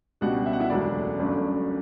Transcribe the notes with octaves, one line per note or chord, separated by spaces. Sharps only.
C#2 B2 G3 D4 F#4 F#5
E5
F#5
E4 E5
E1 D2 C#3 F#3 A3 D4 D5
G1 F#2 D3 F#3 A3